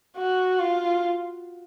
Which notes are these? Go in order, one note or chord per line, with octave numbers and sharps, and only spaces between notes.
F#4
F4